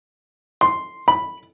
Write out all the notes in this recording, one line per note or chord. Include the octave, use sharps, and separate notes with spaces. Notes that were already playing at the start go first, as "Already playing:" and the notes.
C6
B5